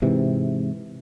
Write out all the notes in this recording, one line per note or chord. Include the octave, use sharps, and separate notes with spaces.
G#2 C3 E3